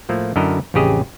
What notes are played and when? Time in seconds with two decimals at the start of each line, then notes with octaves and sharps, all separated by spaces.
0.09 A2 F3 A3 A#3
0.36 F#2 D3 E4 A4 A#4 D#5
0.74 A1 F2 C#3 G4 G#4 D#5